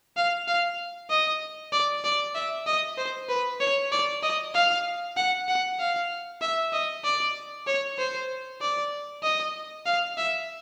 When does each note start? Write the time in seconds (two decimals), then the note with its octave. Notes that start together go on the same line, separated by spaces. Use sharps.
0.17 F5
0.48 F5
1.10 D#5
1.73 D5
2.04 D5
2.35 E5
2.67 D#5
2.98 C5
3.29 B4
3.61 C#5
3.92 D5
4.23 D#5
4.54 F5
5.17 F#5
5.48 F#5
5.79 F5
6.42 E5
6.73 D#5
7.04 D5
7.67 C#5
7.98 C5
8.61 D5
9.23 D#5
9.86 F5
10.18 E5